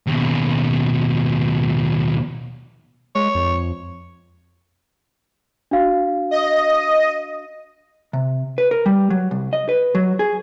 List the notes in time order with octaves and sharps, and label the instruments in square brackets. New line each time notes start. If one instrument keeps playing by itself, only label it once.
[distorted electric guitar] D#2 B2
[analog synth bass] G#3 [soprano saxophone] C#5
[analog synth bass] F2
[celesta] D4 F#4 F5
[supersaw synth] D#5
[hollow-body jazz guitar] C3
B4
A#4
G3
F#3
C2
D#5
B4
F#3
G#4